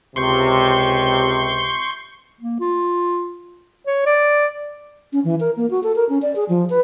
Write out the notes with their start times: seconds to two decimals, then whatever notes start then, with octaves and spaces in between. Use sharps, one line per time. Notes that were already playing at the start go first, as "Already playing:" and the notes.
0.16 C#2 C3 C6 C#6 G6
2.41 A#3
2.60 F4
3.87 C#5
4.06 D5
5.13 C#4
5.24 E3
5.40 A#4
5.57 A#3
5.71 F#4
5.83 A4
5.96 A#4
6.09 C#4
6.22 D5
6.36 G#4
6.49 F3
6.70 B4